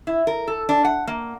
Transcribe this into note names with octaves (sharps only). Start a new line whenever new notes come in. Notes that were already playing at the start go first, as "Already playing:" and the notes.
E4
A#4
A4
D4
F#5
A#3